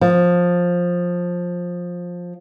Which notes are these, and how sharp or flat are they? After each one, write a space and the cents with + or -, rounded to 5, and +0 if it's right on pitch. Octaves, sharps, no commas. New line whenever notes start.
F3 +15